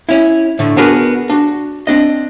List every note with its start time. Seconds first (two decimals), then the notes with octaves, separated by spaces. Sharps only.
0.09 C#4 E4
0.59 A2 D3 A3
0.77 B3 D4 F#4 G#4 A#4 B4
1.30 D4 F#4
1.87 C4 D4 D#5